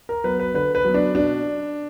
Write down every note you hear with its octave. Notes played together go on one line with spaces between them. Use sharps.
A#4
F#3 B3 B4
B4
D3 B4
B4
F#3 B3
D4
B2 D4